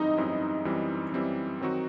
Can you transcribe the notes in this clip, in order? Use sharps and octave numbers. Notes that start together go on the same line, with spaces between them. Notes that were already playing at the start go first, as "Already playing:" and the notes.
Already playing: F#2 E3 G3 C4 D#4 E4
F#2 E3 G3 C4 E4
F#2 E3 G3 C4 E4
F#2 E3 G3 C4 E4
D#3 F#3 C4 D#4 F#4